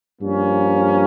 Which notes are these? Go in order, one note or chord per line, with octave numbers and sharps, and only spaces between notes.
G2 F3 A#3 C#4